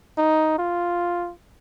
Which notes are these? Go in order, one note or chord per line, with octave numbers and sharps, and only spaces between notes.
D#4
F4